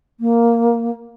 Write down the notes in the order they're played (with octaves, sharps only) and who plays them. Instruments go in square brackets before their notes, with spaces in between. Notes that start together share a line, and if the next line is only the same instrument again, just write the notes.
[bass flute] A#3